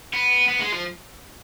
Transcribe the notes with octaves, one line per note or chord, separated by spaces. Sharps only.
B3
B3
G#3
F3